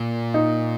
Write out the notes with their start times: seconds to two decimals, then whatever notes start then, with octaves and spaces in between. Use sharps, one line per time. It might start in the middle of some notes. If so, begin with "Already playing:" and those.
Already playing: A#2
0.34 D#4